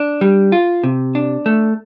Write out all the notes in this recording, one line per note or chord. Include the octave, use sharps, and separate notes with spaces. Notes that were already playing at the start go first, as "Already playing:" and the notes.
Already playing: D4
G3
F4
C3
D4
A3